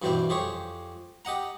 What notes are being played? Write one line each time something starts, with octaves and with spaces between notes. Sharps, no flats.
G2 B2 E3 C4 D4 G5
F2 G4 G#4 C5 C#5
G4 D#5 F#5 A#5